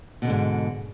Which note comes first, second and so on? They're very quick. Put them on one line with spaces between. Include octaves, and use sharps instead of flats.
B2 D#3 D3 G#2